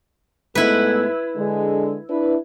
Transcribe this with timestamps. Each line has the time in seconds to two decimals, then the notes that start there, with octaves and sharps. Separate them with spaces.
0.55 G#2 A3 B3 E4 B4
1.37 D3 G#3
2.10 D4 E4 B4